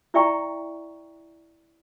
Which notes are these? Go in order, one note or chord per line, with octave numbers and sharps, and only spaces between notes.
E4 D5 E5 G5 A#5 C#6